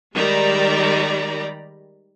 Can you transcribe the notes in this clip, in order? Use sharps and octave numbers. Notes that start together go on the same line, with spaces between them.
D#3 G3 G#3 D5 A#5 B5